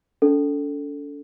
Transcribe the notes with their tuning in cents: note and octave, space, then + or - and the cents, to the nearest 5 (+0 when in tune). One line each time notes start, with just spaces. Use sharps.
D4 -45 A4 +5